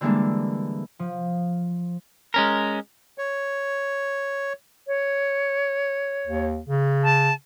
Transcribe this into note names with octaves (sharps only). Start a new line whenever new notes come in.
D3 E3 G3 G#3 A#3 D4
F3
G#3 C#4 A#4
C#5
C#5
D#2
C#3
A5